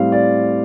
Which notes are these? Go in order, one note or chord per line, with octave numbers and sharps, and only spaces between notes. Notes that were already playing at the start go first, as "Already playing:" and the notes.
Already playing: A2 G3 C4 F5
D5